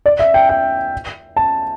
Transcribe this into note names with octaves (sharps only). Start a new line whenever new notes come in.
D5
E5
G5
G5
A5